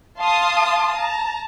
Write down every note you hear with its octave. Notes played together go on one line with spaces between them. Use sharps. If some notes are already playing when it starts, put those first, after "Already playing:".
F5 A5 C6 D#6
A5 A#5